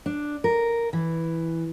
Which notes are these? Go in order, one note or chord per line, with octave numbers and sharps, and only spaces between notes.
D4
A#4
E3